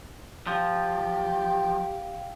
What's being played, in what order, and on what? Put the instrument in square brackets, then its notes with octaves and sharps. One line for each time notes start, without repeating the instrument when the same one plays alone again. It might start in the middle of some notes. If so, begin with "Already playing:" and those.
[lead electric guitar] F3 [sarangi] G4 [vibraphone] F5